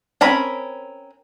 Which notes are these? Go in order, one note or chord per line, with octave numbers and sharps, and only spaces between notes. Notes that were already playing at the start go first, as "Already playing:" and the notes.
C4 C#4 A#4 B5